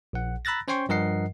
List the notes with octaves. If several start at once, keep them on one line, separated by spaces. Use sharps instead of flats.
A#1 F#5
A#5 B5 E6 F#6 A6 A#6
C#4 C5 C#5 G5 C6 C#6
G2 F3 A#4 D#5 F#5 C7